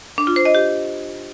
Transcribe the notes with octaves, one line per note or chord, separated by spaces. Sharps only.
D4
F4
C5
D#5
G4